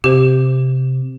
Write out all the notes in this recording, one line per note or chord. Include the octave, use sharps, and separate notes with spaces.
C3 G4 C5